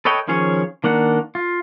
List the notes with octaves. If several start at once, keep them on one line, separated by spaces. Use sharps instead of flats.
A4 B4 C#5 D#5 G5
D#3 F3 C#4 G#4 C#5
D#3 A#3 D4 F#5
F4